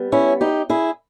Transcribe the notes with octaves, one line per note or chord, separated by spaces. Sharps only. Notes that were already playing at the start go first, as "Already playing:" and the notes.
Already playing: G3 B3
C#4 E4
D#4 G4
E4 G#4